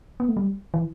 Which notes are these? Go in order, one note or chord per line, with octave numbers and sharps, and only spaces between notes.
B3
A3
G3
E3